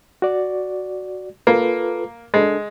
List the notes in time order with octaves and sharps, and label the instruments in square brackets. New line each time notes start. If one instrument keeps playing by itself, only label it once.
[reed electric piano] F#4 D5
[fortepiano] A#3 [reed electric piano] F4 A4 B4
[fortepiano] G#3 [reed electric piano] D4 A4